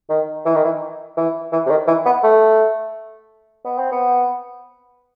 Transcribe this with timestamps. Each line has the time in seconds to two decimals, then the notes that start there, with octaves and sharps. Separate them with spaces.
0.10 D#3
0.46 E3
0.55 D#3
0.65 E3
1.17 E3
1.53 E3
1.66 C3
1.70 D#3
1.87 E3
2.06 B3
2.24 A3
3.65 B3
3.79 C4
3.92 B3